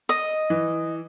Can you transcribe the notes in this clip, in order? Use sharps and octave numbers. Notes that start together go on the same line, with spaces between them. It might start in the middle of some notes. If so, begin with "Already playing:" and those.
D#5
E3